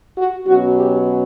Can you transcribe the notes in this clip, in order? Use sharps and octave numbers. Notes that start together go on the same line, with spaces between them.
F#4
B2 F#3 C#4 F#4
G4